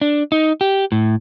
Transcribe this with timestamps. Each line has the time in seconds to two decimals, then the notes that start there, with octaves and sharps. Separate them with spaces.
0.01 D4
0.32 D#4
0.61 G4
0.92 A2